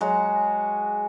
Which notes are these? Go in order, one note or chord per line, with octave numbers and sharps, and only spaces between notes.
F#3 G#3 F#4